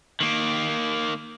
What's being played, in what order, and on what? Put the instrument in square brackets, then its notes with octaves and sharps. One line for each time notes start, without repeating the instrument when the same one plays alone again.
[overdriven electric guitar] D#3 A#3